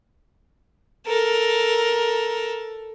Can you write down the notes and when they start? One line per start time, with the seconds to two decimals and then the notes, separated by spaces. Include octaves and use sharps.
1.06 A4 A#4